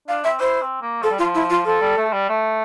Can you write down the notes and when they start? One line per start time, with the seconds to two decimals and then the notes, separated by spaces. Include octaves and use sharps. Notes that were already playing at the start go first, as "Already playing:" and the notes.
0.08 D4 F5
0.24 C4 E5
0.40 E4 C5
0.61 C4
0.82 A#3
1.03 F3 A4
1.11 G3
1.19 F3 F4
1.35 E4
1.50 F4
1.65 F3 A4
1.81 G3
1.97 A3
2.13 G3
2.29 A3